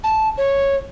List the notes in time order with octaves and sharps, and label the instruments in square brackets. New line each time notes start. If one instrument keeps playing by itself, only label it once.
[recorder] A5
C#5